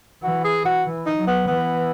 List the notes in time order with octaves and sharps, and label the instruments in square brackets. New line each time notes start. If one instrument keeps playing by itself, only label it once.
[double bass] E3 [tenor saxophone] F#4
[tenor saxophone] G#4
F#4
[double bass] E3
[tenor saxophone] D#4
[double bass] F#3
[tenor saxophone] B3
[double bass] E3 [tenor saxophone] B3